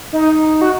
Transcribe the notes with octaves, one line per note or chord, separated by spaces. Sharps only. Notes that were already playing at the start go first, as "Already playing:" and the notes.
D#4
F#4